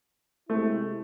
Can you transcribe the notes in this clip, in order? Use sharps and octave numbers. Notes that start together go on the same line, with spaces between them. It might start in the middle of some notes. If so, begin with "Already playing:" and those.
C3 G#3 A3 C4 E4